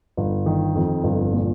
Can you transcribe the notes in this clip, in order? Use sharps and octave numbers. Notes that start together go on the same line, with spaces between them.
G1
D#3
F2
G1
A#2